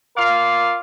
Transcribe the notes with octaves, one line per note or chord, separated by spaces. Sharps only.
F4 A#4 D5 F5